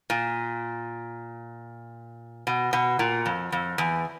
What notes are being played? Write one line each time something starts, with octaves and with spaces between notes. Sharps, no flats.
A#2
B2
B2
A#2
F2
F2
E2